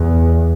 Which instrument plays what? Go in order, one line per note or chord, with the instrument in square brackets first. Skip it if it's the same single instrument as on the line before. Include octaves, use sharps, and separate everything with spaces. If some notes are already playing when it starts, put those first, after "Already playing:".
Already playing: [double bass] E2